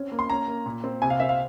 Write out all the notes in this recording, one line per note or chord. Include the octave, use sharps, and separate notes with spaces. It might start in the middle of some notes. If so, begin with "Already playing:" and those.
Already playing: C4 C#4
A#3
C6
C#4 A#5
A#3
A#2
C4
C3 G#5
F5
C4 E5
F5